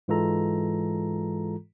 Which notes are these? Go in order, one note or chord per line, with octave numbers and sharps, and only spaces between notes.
G#2 E3 G#3 F4 A4 A#5